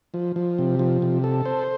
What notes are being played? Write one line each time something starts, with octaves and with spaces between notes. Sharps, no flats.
F3
F3
C3
F3
C3
A4
C5